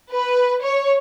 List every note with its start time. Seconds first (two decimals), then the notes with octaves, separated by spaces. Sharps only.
0.12 B4
0.62 C#5